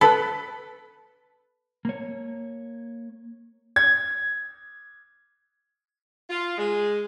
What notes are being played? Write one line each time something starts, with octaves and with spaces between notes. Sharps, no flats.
A4 B4 B5
A#3 C#5
G#6
F4
G#3